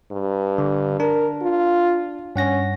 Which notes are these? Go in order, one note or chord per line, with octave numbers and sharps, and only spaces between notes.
G2
D3
D4 A#4
F4
G2 C#4 F#5 A#6